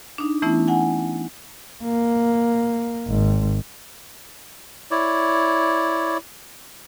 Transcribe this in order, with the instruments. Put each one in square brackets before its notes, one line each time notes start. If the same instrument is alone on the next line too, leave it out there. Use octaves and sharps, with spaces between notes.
[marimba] D4 D#4
E3 A3 B3 C#4 E4
F#5 G#5
[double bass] A#3
G#1
[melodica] E4 C#5 D5